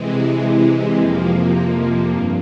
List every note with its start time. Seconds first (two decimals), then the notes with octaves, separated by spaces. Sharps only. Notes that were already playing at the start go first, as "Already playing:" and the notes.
Already playing: C3 E3 G#3
1.00 F2 C3 F3 A#3
2.10 G2